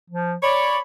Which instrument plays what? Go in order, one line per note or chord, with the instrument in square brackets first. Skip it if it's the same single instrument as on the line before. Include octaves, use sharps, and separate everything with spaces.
[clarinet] F3
[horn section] C#5 D5 [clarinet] B5